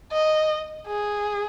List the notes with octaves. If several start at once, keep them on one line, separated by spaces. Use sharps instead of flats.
D#5
G#4